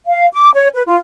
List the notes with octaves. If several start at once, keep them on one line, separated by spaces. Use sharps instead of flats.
F5
D6
C#5
B4
F4